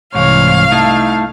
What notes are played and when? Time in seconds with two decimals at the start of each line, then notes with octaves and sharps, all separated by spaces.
0.15 C2 G#2 E3 C#5 F5
0.72 A3 D#4 E4 A5